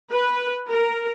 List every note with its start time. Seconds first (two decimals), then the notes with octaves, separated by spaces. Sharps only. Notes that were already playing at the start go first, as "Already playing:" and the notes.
0.10 B4
0.68 A#4